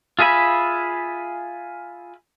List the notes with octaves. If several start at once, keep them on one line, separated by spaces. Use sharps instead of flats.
F4 G#4 E5 G#5 B5